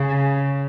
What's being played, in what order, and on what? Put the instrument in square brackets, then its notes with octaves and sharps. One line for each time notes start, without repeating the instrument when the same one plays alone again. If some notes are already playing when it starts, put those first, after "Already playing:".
Already playing: [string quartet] C#3